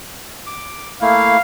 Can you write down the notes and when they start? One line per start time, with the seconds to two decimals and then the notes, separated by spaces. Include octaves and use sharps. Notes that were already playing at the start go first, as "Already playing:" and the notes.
0.46 D6
1.02 A3 A#3 E4 F5